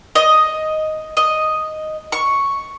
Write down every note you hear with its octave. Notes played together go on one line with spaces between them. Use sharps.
D#5
D#5
C#6